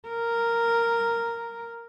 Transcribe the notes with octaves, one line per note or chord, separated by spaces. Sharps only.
A#4